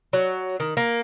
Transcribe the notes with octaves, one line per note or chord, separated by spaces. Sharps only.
F#3
D#3
A#3